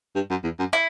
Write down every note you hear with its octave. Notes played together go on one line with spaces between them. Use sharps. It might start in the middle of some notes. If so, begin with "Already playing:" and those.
G2
F#2
E2
F#2
E4